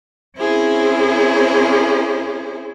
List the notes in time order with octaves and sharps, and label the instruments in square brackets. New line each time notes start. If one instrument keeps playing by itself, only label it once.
[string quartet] C4 C#4 E4 G#4 A#4 C5